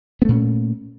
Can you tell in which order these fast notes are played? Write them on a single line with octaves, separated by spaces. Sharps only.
B3 A3 A#2 C#4